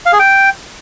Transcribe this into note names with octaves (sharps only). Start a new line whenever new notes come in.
F5
G#4
G5